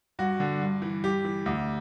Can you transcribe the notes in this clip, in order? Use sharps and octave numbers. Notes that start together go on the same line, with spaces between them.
G2 F#4
D3
G2
E3
G2 G4
E3
D2